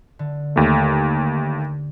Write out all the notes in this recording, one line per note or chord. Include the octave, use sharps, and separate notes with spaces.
D3
D#2 A3